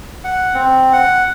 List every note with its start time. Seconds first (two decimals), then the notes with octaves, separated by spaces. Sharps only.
0.24 F#5
0.54 C4
0.93 F#5